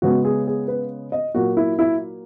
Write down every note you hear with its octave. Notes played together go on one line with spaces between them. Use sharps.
C#3 G#3 B3 F#4
G#4
G#4
B4
D#5
A#2 F#3 A#3 F#4
E4
E4